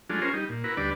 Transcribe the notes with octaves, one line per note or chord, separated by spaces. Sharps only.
F#3 G#3 A3 D4 F4
C#4 F4 G#4 A#4 C5
G3 D#4
A#2
E4 F#4 A#4 B4
D2 G3 D4 B4 D5